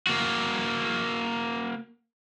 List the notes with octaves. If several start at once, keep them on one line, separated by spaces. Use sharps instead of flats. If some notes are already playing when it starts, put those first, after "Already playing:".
A#3 F#4